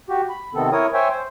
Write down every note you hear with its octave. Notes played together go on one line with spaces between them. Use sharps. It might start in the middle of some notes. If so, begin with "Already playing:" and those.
F#4 G4
B5
C3 D#3 B3 C4 A4
E4 A#4 C#5 D#6
C5 C#5 E5 G5 G#5
C5